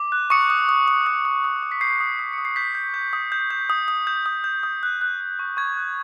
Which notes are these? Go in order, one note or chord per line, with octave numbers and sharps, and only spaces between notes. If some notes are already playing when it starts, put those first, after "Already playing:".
Already playing: D6
F#6
C#6 D#6 C#7
D#6
D#6
D#6
D#6
D#6
D#6
D#6
B6
G6 C7
D#6
D#6
D#6 C#7
C7
G6 B6
G6
G6
D#6
G6
G6
D#6
D#6
G6
D#6
G6
D#6
F#6
F#6
F#6
C#6
C#6 G#6
F#6